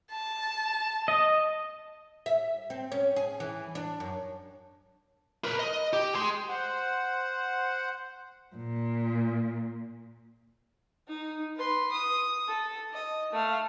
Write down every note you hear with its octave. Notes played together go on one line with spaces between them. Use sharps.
A5
D#5
E5
C4
C#4
G#4
E3
D4
F#2
A#4 B4
D#5
G4
G#4 C6
C5 F#5
A#2
D#4
B4 C6
D#6
A4
D#5
A3 F5